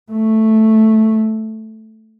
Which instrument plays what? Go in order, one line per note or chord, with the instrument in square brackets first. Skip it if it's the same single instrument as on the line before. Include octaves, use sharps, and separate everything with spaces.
[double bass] A3